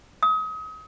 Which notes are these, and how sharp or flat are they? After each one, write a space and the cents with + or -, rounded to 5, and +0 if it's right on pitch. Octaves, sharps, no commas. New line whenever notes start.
D#6 +35